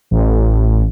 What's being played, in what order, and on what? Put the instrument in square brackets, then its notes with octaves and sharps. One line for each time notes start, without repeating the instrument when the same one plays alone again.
[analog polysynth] A1